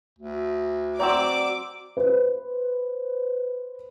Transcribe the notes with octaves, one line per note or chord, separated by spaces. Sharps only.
D2
F#3 C4 D5 D6 E6
B4 C5